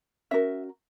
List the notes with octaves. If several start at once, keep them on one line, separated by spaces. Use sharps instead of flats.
C#4 F#4 A#4 E5